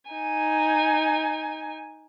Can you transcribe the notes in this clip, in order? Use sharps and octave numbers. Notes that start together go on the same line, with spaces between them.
D#4 G#5